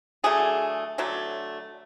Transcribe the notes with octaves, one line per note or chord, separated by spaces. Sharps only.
D3 F#3 A3 G#4
D3 F#3 A3